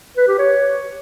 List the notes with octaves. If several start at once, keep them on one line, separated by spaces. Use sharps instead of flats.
B4
G4
C#5